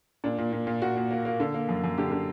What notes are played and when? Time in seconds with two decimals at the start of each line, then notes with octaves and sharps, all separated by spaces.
0.24 A#2 D4
0.38 A#2
0.52 A#2
0.67 A#2
0.82 A#2 F#4
0.97 A#2
1.11 A#3
1.25 A#3
1.40 D3
1.54 A#3
1.69 F#2
1.84 F#2
1.98 D3 G4
2.12 D3